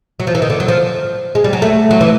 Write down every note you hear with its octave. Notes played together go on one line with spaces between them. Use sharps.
F#3
F3
E3
D#3
D3
F#3
F3
G#3
G3
F#3
A3
F#3
E3